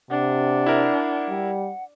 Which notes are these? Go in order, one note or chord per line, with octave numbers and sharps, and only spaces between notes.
C3 D4 F#5
E4 A#4
G3